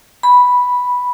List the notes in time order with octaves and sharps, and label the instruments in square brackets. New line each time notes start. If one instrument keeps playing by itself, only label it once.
[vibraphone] B5